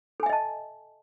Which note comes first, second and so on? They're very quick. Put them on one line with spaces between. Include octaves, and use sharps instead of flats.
A4 G#5 E5 D#5 A5